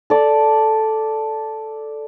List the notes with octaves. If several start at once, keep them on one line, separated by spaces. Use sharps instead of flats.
A4 D5